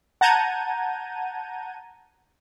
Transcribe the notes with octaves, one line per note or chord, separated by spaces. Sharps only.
F#5 A5 A#5 G6 G#6 D#7